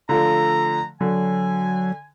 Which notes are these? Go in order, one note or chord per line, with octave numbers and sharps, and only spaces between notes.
D3 F3 A3 A#5
D3 F#3 G#5